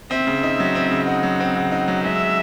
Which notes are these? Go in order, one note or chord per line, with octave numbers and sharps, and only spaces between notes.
C4 E5
C#3
D#4
F#3
C4
C#3
D#4 F#5
F#3
C4
C#3
D#4
F#3
G#3 E5